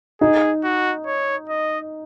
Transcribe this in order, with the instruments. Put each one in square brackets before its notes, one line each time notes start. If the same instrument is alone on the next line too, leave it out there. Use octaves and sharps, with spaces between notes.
[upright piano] D#4 [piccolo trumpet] G#4
[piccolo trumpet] F#4
C#5
D#5